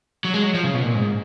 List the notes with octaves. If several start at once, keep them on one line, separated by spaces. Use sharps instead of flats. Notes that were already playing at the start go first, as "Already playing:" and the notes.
F#3
G#3
F#3
F3
C#3
B2
A#2
G#2